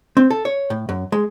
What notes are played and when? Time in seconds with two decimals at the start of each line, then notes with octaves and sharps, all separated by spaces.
0.17 C4
0.30 A4
0.45 C#5
0.70 A2
0.89 F#2
1.12 G#3